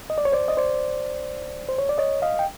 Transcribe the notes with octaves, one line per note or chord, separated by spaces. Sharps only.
D#5
D5
C#5
C5 D5
D#5
C5 D5
C5
C#5
D5
C#5 D#5
D#5 F5
G5